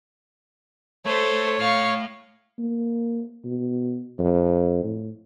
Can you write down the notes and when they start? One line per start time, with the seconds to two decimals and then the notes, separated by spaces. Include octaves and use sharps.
1.06 A3 A4 C5 C#5
1.59 A2 F5 C#6
2.58 A#3
3.45 B2
4.19 F2
4.83 A2